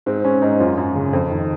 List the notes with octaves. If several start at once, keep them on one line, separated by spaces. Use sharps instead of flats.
G#2 C4
G#2 C#4
G#2 D#4
F#2 F4
F#2
C#3
F2
D#3